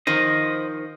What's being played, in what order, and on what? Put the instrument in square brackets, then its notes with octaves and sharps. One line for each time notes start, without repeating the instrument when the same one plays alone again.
[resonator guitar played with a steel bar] D#3 F3 [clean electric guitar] C5 D#5